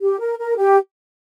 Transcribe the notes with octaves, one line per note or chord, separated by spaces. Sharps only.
G4
A#4
A#4
G4